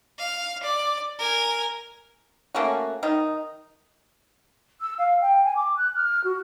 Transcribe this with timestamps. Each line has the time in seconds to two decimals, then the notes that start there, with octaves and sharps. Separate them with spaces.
0.18 F5
0.63 D5
1.19 A#4 G#5
2.55 A3 A#3 C#4 F#4
3.03 D#3 D#4
4.81 E6
4.98 F5
5.21 G5
5.44 G#5
5.55 D6
5.77 F#6
5.95 F6
6.24 F#4